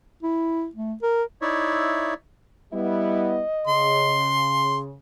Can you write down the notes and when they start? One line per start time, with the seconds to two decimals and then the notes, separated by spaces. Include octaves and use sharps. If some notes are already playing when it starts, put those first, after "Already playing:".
0.23 E4
0.75 A3
1.02 A#4
1.42 D#4 E4 C#5 D5 E5
2.73 G3 B3 E4 D#5
3.67 C#3 C6